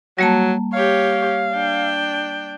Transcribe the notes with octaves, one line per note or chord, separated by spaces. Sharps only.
F#3 G3 A#3 A5
G4 C#5 F5
D4 G5